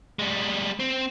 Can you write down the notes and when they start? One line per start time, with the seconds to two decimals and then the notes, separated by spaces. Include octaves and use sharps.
0.19 G3 G#3
0.80 C4